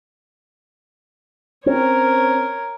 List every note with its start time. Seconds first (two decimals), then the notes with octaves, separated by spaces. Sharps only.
1.66 C4 C#4 A#4 C#5